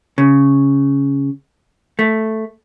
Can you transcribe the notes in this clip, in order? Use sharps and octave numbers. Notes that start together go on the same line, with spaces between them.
C#3
A3